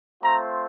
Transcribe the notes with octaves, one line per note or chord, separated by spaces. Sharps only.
A3 C4 F4 A#5